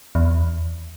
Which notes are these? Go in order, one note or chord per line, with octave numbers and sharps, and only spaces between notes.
E2